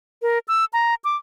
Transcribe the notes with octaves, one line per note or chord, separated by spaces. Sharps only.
A#4
E6
A#5
D6